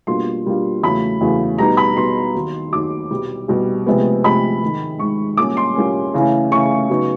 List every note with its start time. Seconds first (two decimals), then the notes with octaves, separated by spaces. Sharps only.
0.07 B2 G3 A#3 D4 F4 C6
0.46 B2 G3 A#3 D4 F4
0.83 E2 C#3 F#3 A3 B5
1.21 E2 C#3 F#3 A3
1.58 B2 G3 B3 D#4 A#5
1.77 B5
1.96 B2 G3 B3 D#4 C6
2.35 D#2 D#3 F#3
2.72 D#2 D#3 F#3 D6
3.10 C2 B2 G3
3.48 C2 B2 G3
3.86 D2 C3 F3 G#3 B3
4.24 D2 C3 F3 G#3 B3 B5
4.62 G#2 D#3 G#3
4.99 G#2 D#3 G#3 C#6
5.37 C2 A#2 G3 A#3 C#4 D6
5.57 C6
5.75 C2 A#2 G3 A#3 C#4
6.14 C#3 E3 A3 C#4 E4
6.51 C#3 E3 A3 C#4 E4 C#6
6.90 C#3 F#3 B3 D#4